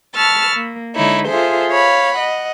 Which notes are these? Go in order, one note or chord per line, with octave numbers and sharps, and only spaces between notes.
A5 B5 C#6 E6 F6 A6
A#3
D3 G#3 D#4 E4 C#5
F4 G#4 A4 C5 E5
C#5 F5 B5
D#5 F#5